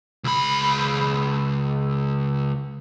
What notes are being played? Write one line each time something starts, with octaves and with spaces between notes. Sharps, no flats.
C#2 B5